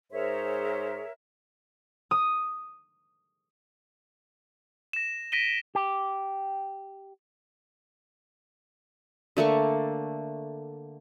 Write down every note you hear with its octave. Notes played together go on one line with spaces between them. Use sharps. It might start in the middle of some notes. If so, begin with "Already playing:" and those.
G#2 G#4 A#4 C5 C#5 E5
D#6
A#6 E7
A#6 B6 D7 D#7 G7
G4
D3 A3 A#3 C#6